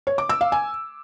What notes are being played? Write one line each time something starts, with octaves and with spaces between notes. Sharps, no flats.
C#5
D6
E6
F5
G#5